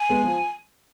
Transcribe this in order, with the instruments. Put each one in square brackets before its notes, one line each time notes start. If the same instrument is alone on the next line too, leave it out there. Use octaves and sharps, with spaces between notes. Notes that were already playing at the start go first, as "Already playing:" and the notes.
Already playing: [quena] G#5
[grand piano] G#3 B3
F3